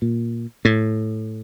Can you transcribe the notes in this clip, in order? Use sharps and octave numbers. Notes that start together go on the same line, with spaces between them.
A#2
A2